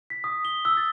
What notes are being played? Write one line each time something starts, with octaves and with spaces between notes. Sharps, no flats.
B6
D#6
G7
E6
A6